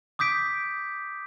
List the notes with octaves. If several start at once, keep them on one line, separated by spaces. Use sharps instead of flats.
D6 D#6 G6 B6 D7